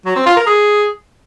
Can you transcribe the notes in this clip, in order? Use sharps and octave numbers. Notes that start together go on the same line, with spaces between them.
F#3
C4
F4
A#4
G#4